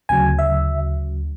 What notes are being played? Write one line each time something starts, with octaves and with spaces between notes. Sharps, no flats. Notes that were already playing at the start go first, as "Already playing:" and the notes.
D2 C#3 F#3 G#5
E5